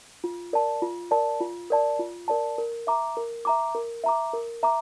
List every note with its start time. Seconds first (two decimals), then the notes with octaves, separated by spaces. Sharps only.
0.24 F4
0.53 A#4 D5 A5
0.82 F4
1.11 A#4 D5 A5
1.40 F4
1.70 A#4 D5 A5
1.99 F4
2.28 A#4 D5 A5
2.58 A#4
2.87 E5 A#5 D6
3.17 A#4
3.45 E5 A#5 D6
3.75 A#4
4.04 E5 A#5 D6
4.33 A#4
4.63 E5 A#5 D6